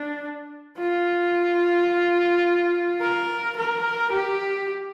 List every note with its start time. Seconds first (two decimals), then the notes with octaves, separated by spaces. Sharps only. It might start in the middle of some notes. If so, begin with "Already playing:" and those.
Already playing: D4
0.79 F4
3.01 A#4
3.57 A#4
4.12 G4